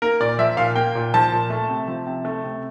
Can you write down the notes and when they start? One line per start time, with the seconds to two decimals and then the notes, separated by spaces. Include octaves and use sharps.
0.02 A#3 A#4
0.20 A#2 D5
0.38 F3 E5
0.57 A#2 F5
0.75 A#3 G5
0.95 A#2
1.14 F3 A5
1.32 A#2
1.50 A3
1.69 C3
1.88 F3
2.07 C3
2.25 A3
2.44 C3